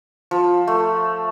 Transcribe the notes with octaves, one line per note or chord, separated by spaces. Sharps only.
F3
A3